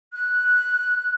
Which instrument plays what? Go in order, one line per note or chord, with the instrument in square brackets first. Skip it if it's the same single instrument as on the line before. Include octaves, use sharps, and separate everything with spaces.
[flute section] F#6